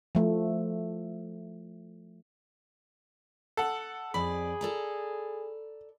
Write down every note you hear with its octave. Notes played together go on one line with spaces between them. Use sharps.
F3 A3
A4 F#5
F2 G#4 D5 B5
A4 D5 A#5